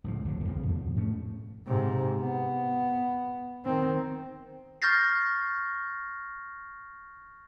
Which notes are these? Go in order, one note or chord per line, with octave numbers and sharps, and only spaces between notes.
C#2 A2 F3
D1 G1 D2 D3
B1 F2 C#3 F3
E2 B2 F3
G#2 A3 C#4
G#2 C3
B3
D#3 C4
C#6 F6 G6 A6 A#6 C7